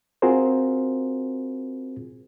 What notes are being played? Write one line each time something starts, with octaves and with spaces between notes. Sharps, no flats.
C4 F4 F#4 G#4 A#4 C5